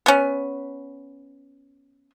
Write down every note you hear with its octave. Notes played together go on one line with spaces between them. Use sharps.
B3 C#4